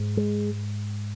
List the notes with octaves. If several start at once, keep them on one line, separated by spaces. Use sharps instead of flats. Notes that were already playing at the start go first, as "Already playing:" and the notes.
Already playing: G#2
G#3